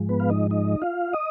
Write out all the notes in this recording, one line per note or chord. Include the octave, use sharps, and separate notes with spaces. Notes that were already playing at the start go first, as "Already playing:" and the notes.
Already playing: G#2 F3 G#3
B3 B4
F5
D#4 D#5
D#4 D#5
F4 F5
D#5 D#6